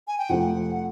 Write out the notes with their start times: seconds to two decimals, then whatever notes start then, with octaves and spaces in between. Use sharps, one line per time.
0.07 G#5
0.18 G5
0.29 F2 C3 F3 A3 F#5